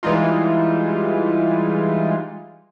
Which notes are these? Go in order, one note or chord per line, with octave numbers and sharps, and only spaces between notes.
E3 G3 G#3 D#4 F4